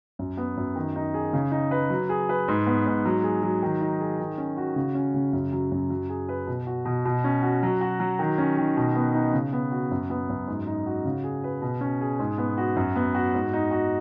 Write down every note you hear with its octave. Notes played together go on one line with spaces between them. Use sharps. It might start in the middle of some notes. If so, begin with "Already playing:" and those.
F#2
B3
F#2
D#3
D#4
G#4
C#3
D#4
B4
F#3
G#4
B4
G#2
B3
G#2
F#3
G#4
F#3
D#3
D#4
G#4
D#3
C#4
F#4
C#3
C#4
C#3
F#2
F#3
F#2
F#3
G#4
B4
B2
F#4
B2
B2
C#4
F#4
F#3
F#4
F#3
D#3
C#4
D#3
B2
B3
D#4
C#3
B3
F#4
F#2
B3
F#2
G#2
D#4
F#4
C#3
G#4
B4
B2
C#4
G#4
G#2
B3
F#4
F#2
B3
F#4
G#2
D#4
F#4